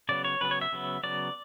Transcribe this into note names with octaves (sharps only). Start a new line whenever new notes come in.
C#3 F#3 B3 D5
C#5
C#3 F#3 B3 B4
C#5
E5
C#3 F#3 B3
C#3 F#3 B3 D5